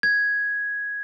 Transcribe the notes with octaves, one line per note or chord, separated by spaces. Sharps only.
G#6